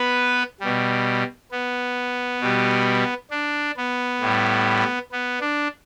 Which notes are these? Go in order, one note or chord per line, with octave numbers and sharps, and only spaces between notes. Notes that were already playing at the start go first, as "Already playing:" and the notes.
Already playing: B3 B4
B2 G3
B3
B2 G3
D4
B3
A2 G3
B3
D4